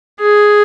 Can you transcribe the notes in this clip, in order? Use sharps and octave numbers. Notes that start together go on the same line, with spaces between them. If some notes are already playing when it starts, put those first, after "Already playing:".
G#4